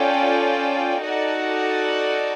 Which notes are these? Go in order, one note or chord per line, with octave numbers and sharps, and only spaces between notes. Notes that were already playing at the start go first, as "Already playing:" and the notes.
Already playing: C#4 F4 A4 D5 G5
D#4 F#4 A4 D5 F#5